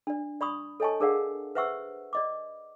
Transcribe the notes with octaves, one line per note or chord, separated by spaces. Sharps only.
D4 D5
D5 B5 C#6 D#6
A4 C#5 D#5 G#5 A5 C#6
D4 G#4 A#4 D5 F5 F#5
B4 C5 E5 F#5 C#6 E6
D5 D#5 D6